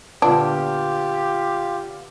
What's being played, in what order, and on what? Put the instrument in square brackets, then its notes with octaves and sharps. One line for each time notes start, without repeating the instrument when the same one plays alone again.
[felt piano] A#2 D3 B3 [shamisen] D4 [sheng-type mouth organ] F4 [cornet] G4